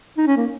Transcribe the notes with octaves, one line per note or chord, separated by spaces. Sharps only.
D#4
C#4
A#3